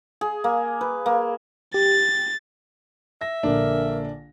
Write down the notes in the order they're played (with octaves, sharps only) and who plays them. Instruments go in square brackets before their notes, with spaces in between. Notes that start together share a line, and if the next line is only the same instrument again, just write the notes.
[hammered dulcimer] G#4
A#3
B4
A#3
[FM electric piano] G4 [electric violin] A6
[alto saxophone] E5 [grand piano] A#6
[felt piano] A#1 D3 A#3 [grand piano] D4 [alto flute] A#4